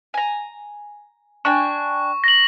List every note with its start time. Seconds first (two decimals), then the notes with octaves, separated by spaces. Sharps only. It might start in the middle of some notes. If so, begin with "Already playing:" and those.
0.14 G#5 A#5
1.45 D4 G5 G#5 C#6
2.24 A#6 F#7